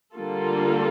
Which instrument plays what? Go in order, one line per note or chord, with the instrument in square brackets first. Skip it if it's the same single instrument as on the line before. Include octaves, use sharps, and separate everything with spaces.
[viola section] D3 G3 A#3 F4 A4